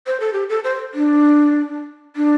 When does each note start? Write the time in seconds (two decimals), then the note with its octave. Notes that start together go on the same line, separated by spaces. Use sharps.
0.07 C5
0.20 A4
0.33 G4
0.49 A4
0.64 C5
0.94 D4
2.16 D4